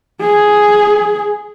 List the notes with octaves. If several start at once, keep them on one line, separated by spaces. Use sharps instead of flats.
G#4